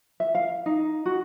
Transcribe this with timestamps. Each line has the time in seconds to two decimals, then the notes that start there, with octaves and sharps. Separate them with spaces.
0.20 E5
0.35 F5
0.66 D#4
1.06 F#4